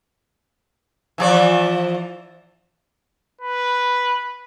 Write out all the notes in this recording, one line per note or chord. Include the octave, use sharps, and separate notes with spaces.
E3 F3 D5
B4